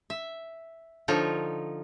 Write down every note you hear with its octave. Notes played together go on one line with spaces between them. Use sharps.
E5
D3 F3 D#4 F4 C#5